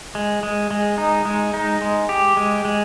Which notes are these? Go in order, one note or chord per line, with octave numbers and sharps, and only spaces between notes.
G#3
G#3
G#3
D#4
G#3
D#4
G#3
G4
G#3
G#3